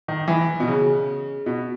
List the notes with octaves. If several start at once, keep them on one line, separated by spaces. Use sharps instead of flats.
D#3
E3
B2
C#3
B2